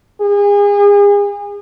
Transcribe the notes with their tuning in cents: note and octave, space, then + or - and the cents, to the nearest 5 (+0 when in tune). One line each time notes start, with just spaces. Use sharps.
G#4 -35